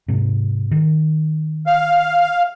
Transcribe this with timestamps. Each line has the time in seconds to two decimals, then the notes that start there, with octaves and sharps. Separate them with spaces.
0.08 G#2 C3
0.71 D#3
1.67 F5